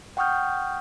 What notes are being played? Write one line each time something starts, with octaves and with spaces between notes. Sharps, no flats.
F#5 G5 C#6 D#6 F6 G6